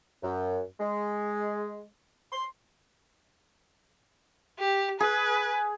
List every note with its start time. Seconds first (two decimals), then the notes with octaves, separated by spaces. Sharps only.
0.22 F#2
0.80 G#3
2.32 C6
4.60 G4
5.00 G#4 B4